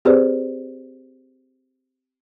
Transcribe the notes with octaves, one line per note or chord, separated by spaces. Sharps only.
C4 G4 G#4 B4 C5 D5